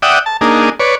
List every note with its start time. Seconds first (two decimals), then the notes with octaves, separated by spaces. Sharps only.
0.02 D5 E5 F#5 G5 D#6
0.26 A5
0.41 A#3 D4 D#4 G#4
0.80 B4 C#5 D5